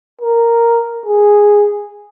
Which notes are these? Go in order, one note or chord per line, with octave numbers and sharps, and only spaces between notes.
A#4
G#4